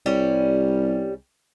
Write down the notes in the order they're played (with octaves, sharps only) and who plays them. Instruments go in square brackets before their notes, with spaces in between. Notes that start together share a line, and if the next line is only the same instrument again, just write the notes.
[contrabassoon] C2 [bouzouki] G3 C#4